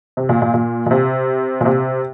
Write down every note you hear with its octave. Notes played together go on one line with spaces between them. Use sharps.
C3
A#2
A#2
A#2
A#2
C3
A#2
C3